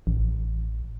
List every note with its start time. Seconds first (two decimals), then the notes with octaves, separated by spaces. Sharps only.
0.07 A1